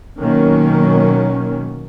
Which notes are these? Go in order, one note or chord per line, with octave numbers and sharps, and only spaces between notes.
B2 D#3 F#3 A#3 C#4